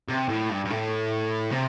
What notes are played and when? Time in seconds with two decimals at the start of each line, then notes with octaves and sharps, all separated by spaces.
0.09 C3
0.29 A2
0.50 G2
0.65 G2
0.70 A2
1.51 C3